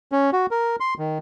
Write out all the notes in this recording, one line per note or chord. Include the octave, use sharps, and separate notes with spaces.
C#4
F#4
A#4
C6
D#3